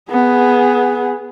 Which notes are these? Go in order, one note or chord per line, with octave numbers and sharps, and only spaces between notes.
B3 G#4